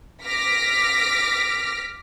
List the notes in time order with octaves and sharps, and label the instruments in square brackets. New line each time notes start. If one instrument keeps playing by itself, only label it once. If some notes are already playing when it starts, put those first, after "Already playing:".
[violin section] D6 F6 A#6 B6